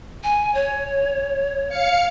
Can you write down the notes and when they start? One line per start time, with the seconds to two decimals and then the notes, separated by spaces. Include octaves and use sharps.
0.24 G#5
0.54 C#5
1.69 F5 C#7